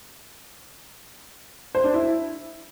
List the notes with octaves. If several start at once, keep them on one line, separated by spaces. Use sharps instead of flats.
C5
D4
E4